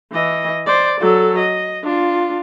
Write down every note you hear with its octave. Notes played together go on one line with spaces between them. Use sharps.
E3 D#5
C5 D5
F#3 A4
D#5
D4 F4